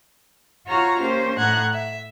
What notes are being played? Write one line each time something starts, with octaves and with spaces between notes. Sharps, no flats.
F4 F#4 C#5 A#5 F6
A#3 C#4 G4 C5
A2 F#5 A#5 F#6 G#6
E5